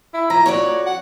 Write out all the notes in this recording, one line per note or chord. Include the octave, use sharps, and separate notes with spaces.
E4
F3 A#5
F2 F#4 C#5 D5
F#5